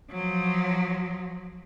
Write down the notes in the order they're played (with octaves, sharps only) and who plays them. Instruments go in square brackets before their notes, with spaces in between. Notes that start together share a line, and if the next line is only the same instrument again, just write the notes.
[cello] F3 F#3